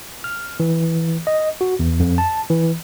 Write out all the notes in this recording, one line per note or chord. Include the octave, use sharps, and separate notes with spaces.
F6
E3
D#5
F#4
E2
F2
A5
E3